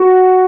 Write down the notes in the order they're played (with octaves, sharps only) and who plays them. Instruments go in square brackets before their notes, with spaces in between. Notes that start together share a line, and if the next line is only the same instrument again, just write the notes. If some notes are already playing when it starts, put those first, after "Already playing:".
Already playing: [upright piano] F#4